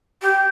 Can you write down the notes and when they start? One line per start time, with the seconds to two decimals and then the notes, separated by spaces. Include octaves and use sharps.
0.22 G4